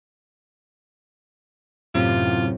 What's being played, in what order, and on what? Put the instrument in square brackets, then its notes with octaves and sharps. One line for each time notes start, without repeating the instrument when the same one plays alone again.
[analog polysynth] F#2 A2 C3 [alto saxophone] F4